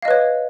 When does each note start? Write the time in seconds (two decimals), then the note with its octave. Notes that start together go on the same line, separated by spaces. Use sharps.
0.02 F5
0.05 D#5
0.08 B4
0.11 C#5